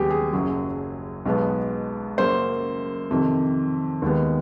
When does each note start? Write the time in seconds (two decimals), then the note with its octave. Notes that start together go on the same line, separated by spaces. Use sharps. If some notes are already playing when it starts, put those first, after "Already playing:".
Already playing: D#2 C#3 F#3 B3 G4 G#4
0.10 G#4
0.33 F#1 F#2 C#3 F#3
1.26 B1 B2 G#3 B3
2.18 F#2 C#3 F#3 A#3 C5
3.11 F2 C3 D#3
4.02 D#2 D#3 G#3 B3